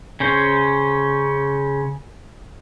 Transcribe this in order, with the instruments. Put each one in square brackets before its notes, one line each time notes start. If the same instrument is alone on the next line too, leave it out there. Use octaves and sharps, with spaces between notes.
[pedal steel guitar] C#3 C#4 C5